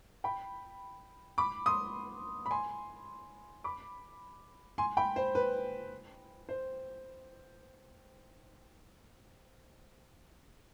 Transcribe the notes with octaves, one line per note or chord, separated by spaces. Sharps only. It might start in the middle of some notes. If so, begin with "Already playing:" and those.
G5 B5
B5 D6
C6 D#6
B5
G#5 C6
B5 D6
G#5 C6
G5 B5
C5
B4
C5